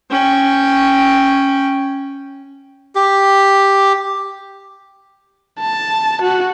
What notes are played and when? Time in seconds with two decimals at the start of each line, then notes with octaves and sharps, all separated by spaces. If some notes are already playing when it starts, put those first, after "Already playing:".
0.11 C#4 G5
2.95 G4
5.59 A5
6.22 F#4